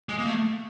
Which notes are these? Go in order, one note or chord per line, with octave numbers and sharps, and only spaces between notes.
G#3
A#3
A3